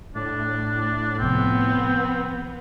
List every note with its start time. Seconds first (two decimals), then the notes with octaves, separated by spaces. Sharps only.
0.15 A2 D4
1.19 C3 F3 B3 C4